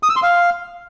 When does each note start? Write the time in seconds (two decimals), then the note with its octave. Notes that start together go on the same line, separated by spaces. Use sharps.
0.03 D#6
0.10 E6
0.16 C6
0.23 F5